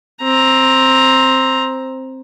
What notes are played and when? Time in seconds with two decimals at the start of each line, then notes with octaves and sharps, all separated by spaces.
0.23 C4 A#5